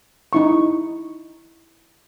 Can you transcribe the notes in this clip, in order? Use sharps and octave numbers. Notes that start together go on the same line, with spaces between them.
D#4 E4 C#6